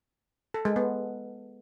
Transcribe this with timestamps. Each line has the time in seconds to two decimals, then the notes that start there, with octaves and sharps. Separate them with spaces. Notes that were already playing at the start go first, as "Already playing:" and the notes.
0.54 A4
0.65 G#3
0.76 B3